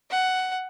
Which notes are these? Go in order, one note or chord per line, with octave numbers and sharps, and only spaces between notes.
F#5